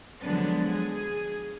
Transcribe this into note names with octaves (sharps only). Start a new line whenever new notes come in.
D3 F3 F#3 G#3 B3 D4
G#4